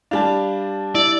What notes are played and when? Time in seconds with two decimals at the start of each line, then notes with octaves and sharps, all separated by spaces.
0.11 G3 D4 F5 A5
0.95 E4 D5